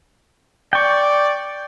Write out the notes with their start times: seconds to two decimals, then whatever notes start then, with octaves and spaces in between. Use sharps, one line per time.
0.73 D5 G5 C#6